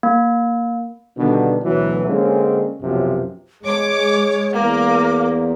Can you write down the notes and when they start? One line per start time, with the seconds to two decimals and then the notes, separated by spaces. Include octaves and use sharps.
0.03 A#3
1.18 B2 D3 D#3 G3 B3 D4
1.63 D2 B2 E3 F#3
2.06 D3 G#3 A#3 C4 C#4
2.81 B1 F#2 C3 F3 F#3 B3
3.65 G#3 C#5 D6
4.55 E2 A#3 D6